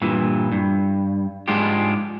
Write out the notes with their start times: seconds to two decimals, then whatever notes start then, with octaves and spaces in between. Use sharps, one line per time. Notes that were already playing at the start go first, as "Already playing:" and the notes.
0.02 G2 A#2 E3
0.52 G2
1.48 G#2 F3 G#3 D4 F4 G4